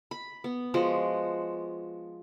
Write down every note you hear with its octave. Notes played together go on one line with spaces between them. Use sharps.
B5
B3
F3 G#3 F#4